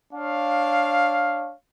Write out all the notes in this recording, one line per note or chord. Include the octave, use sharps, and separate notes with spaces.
D4 C#5 F5